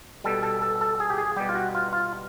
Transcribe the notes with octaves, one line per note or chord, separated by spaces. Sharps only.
B2 G3 A4
A4
A4
A4
G#4
G4
G#4
B2 G3 G4
F4
F#4
F4
F4